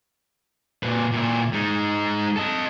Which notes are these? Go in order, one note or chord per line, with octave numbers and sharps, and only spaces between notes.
A#2 B4
A#2 E4
G#3 D#4
A4 D#5